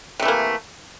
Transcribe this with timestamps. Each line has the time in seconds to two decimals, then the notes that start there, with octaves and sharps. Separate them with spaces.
0.20 C3
0.22 A3
0.25 E3
0.28 A#3